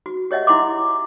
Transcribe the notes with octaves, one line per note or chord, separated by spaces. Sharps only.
F#4
G4 C#5 D#5 E5 F#5
E4 F#5 C6 D6